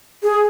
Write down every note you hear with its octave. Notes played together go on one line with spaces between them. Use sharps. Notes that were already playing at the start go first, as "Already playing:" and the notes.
G#4